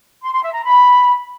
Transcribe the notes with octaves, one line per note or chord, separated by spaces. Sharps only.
C6
C6
E5
A#5
B5